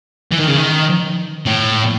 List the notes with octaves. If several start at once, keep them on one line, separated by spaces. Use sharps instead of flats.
E3
D#3
C#3
D#3
A2